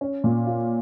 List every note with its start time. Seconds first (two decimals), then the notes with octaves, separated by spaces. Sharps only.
0.01 C#4
0.24 A#2
0.47 F4